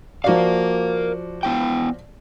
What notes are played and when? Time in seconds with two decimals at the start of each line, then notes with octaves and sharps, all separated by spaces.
0.24 F3 F#4 A#4 D5 F5
1.43 B3 E4 G5